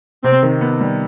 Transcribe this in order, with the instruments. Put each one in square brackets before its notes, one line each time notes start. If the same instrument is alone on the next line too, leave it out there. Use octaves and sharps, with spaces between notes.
[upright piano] C3 [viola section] C4
[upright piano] D#3
B3
G3